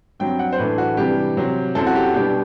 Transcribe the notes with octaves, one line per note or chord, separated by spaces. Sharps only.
G2 F#3 C4 G5
F#5
C5
A2 E3 A3 D4 B4
F#4
C3 E3 G3 D4 G4
C3 F#3 C4
F#2 F#3 C4 E4 A4
F#4
G4
B2 G3 B3 D4 G4